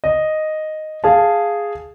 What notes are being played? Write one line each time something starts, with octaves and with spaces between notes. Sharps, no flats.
D#5
G#4 F5 A5